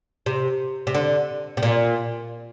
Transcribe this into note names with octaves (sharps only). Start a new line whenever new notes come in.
C3
C3
D3
C3
A#2